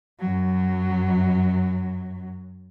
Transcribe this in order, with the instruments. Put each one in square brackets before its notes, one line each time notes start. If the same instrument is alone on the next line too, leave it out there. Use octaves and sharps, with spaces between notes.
[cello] F#2 F#3